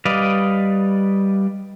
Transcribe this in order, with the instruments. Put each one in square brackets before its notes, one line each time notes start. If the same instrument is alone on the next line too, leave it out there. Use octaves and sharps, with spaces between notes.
[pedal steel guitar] G3 B4 D5 D#5 F5